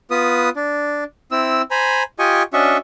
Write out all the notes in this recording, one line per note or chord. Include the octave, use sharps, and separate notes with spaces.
B3 F4 B4 D#6
D4
C4 E4 E6
C5 G#5 A#5 B5
F4 G4 D#5 G#5 C#6
C#4 D4 F#4 D#5 E5 C#6